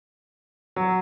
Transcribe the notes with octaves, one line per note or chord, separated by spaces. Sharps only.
F#3